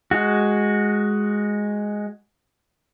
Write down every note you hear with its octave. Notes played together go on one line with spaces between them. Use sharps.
G#3 F#4